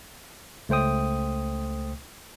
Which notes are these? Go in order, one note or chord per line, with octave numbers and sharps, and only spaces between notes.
C#2 A3 C5 G5 D#6